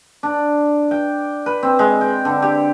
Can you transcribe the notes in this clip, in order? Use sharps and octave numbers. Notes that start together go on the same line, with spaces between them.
D4
G5
B4
C4
G#3
G5
D3
G4